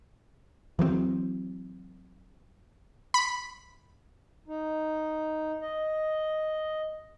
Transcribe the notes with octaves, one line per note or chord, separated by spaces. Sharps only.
E3 F#3 G#3 C4
B5
D#4
D#5